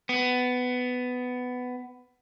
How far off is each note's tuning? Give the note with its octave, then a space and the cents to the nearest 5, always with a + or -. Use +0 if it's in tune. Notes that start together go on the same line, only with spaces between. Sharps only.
B3 +15